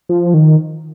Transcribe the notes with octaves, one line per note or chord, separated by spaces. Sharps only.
F3
D#3